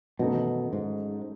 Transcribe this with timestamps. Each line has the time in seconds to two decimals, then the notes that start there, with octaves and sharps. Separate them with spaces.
0.19 G#1 F#2 B2 E3 A3 D#4
0.73 G#2